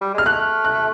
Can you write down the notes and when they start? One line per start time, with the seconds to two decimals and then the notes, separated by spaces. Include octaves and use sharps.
0.01 G3
0.14 G#3 F6
0.26 A3 F#6
0.65 F#6